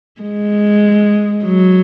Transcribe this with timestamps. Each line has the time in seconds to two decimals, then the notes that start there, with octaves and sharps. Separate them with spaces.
0.21 G#3
1.45 F#3